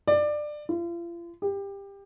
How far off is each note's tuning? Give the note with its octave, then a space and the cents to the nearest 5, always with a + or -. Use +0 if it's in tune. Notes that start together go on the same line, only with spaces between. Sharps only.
D5 +20
F4 -40
G4 +20